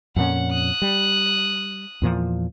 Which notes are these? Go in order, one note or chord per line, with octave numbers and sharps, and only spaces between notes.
F2 A#2 C#4 F#5
D#6 F#6
G3
E2 A#2 F3